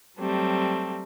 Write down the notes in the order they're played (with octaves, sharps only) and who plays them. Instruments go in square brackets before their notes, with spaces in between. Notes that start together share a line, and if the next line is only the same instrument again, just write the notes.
[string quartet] F#3 G3 A3 C4